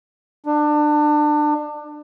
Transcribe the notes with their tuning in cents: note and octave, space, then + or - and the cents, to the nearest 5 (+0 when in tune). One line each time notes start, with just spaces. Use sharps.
D4 +25